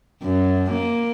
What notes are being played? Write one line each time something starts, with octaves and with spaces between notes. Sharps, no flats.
F#2
A#3